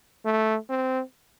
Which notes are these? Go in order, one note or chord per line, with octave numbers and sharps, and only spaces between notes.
A3
C4